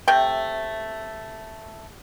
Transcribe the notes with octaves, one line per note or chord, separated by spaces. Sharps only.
C3 A3 G5